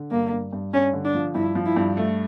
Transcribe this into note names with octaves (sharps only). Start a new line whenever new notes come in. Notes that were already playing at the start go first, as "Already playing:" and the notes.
Already playing: D3
G2 A#3
G2
G2
G2 C#4
D3
D4
F3
G2 E4
F3
E4
G2
A3